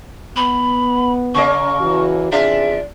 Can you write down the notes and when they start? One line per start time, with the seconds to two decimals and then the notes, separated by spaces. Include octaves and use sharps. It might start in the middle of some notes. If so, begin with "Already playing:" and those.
0.36 B3 B5
1.35 C#3 A#3 D#5 C#6
1.80 E3 F#4
2.32 E2 C3 D4 F4 G#4 E5